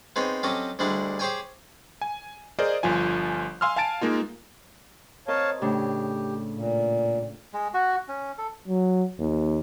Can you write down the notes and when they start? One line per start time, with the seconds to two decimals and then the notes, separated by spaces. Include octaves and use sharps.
0.16 G#3 B3 C4 D#4 C#5
0.43 F#3 C4 C#4 G4 A4 D#5
0.79 D2 G3 G#3 D4 E4 E5
1.19 G4 G#4 C5 C#5 G5 G#5
2.01 G#5
2.59 G#4 A#4 C5 D5 D#5
2.83 G1 F3 F4 G#5
3.61 F5 G#5 C6 E6 F6
3.76 F5 G#5 A5 A6 D7
4.01 G#3 A#3 D#4 F4
5.28 C4 A#4 C#5 D#5 F5 A5
5.62 A2 C#3 D4 G4
6.56 A#2
7.53 G#3
7.74 F#4
8.08 C#4
8.38 A4
8.68 F#3
9.19 D#2